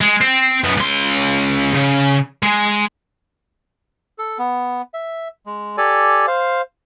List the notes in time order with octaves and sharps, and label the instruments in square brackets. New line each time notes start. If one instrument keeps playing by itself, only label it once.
[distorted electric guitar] G#3
C4
F#2 B3
C#2 C6
C#3
G#3
[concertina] A4
B3
E5
G#3
G4 A4 D5 G#5
C5 F5